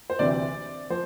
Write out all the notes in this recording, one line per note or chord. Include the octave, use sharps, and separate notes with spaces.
C5
D2 C3 E3 D5
F3 C5